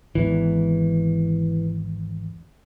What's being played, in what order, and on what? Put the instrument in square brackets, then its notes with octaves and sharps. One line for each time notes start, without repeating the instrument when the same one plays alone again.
[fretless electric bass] G#1 E2 [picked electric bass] E3